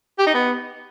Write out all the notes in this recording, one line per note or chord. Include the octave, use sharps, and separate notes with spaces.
G4
D#4
B3